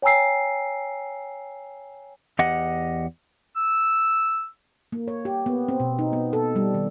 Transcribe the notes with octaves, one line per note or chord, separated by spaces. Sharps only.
C#5 G5 G#5 A#5 E6 C7
E2 G4 D#5 F#5
E6
A#3
C#5
G4
B3
C4
B2
D#4
B3
A4
G3
D#3